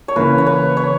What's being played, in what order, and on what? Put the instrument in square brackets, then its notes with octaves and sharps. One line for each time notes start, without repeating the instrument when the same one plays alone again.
[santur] C#5
[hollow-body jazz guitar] C#3 E3 A#3 E4 [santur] B4
[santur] C#5
B4
C#5